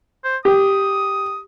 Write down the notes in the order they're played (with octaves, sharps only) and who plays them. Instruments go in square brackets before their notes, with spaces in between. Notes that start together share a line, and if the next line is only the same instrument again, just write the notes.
[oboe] C5
[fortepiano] G4 [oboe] D#6